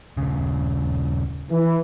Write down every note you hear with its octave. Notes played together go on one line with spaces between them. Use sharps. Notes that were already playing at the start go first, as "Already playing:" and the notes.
D#1 C#3
E3